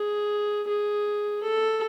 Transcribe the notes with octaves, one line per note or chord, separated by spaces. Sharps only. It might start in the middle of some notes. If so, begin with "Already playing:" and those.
Already playing: G#4
G#4
A4